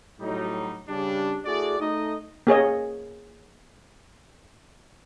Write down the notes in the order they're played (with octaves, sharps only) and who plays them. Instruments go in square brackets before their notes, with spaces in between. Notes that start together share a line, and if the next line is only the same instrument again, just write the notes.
[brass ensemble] A2 F#3 G3 D#4
C#3 G3 D4
A3 E4 F#4 G#4 D5
A3 D#4 D#5
[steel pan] A#3 G#4 C#5 D#5